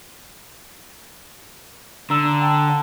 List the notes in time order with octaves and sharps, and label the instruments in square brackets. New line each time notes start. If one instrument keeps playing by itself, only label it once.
[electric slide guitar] D3 [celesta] A#5 E6 E7
[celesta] G5 A5